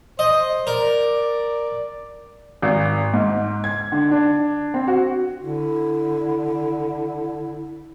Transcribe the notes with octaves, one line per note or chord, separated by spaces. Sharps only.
C5 D#5
A#4 D5
G#1
G#2
G#6
D3
D4
C4
F#4
D3 E4